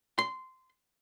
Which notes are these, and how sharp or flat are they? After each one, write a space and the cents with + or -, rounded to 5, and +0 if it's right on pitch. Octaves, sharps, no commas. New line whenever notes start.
C6 -15